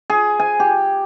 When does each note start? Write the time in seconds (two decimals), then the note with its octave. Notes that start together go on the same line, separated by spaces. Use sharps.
0.10 G#4
0.40 G#5
0.60 G4